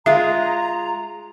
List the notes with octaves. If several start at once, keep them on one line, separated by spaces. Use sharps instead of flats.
G#3 F4 E5 A#5